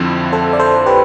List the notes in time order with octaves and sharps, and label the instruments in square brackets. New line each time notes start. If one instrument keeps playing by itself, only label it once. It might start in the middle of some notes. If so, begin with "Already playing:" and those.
Already playing: [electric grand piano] F2 D3 F3 C4 E4
[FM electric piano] A4 C5
D5
A4 C5
G4 B4